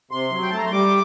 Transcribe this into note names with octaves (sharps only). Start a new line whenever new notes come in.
C3 C6
F#3
G5
A3 A5
A#5
C6
G3 D6